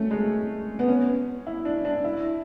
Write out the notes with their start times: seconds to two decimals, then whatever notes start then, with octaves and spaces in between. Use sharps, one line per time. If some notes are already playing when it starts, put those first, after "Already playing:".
Already playing: A3 C#4
0.11 G#3
0.79 B3
0.88 C#4
1.47 E4
1.65 D4
1.85 D4
2.04 E4